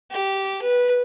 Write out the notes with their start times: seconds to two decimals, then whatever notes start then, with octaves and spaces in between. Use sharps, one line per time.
0.11 G4
0.63 B4